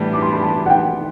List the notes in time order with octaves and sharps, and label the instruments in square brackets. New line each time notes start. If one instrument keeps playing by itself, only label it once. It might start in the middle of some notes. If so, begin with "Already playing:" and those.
Already playing: [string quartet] A2 E3 G3 B3 D4
[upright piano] D6
C6
B5
A5
F#5
G5